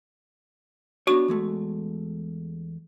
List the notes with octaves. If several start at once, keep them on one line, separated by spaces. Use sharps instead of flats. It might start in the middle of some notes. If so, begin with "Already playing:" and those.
B3 D4 F#4 C#5 C#6
E2 G#3 A3